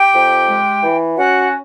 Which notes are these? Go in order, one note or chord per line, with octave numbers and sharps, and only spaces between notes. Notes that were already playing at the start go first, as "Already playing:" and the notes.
Already playing: G4 G5
F2
G#3
E3
C#4 F#4 F#5